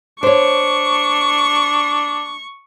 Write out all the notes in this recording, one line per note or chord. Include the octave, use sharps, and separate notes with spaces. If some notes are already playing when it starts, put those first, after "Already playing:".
D4 C5 C#5 C#6